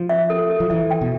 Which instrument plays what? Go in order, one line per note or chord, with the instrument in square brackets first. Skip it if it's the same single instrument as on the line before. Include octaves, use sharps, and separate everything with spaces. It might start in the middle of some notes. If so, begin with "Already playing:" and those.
Already playing: [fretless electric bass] F3
[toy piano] E5
A4
A4
[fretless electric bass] F3
[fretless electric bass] E3 [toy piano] E5
[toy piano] G5
[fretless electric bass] B2